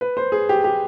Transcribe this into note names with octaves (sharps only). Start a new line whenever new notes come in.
B4
C5
G#4
G4
G4